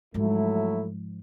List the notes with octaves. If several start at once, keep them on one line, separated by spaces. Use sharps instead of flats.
G#2 F3 F#3 A3 E4